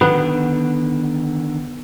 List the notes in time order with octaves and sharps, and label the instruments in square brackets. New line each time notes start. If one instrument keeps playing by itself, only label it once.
[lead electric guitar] D3 D#3 [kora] B3